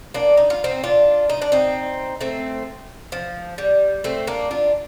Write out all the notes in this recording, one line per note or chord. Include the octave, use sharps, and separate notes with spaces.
A#3 D4
D#4
F4
C4 D#4
D4 F4
D#4
D4
C4 D#4
A3 C4
F3
G3
A3 C4
A#3 D4
D4 F4